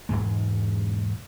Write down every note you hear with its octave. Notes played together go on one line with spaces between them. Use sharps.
E1 F2 G#2 G#3